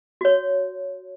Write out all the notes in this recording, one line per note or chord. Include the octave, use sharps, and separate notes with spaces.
F#4 C#5